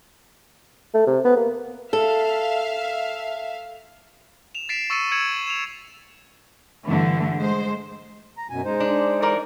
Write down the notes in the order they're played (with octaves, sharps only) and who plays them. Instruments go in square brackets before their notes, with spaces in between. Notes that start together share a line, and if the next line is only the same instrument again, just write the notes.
[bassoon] A3
C3
B3
A#3
[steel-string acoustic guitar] A4 [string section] E5 F5
[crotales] E7 F7
A6 B6 C7 D7 E7
C#6 E6 A6 C#7 D#7
E6 G#6 C#7 D7 E7 F#7
E7 F7
[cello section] G2 D3 E3 A3
G#3 C5
[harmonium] A#5
F#2 B2 G#5
G#3 D#4 C5
[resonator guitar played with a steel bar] D4
E3 A#4 D5